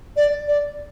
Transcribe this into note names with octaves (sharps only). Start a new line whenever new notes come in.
D5
D5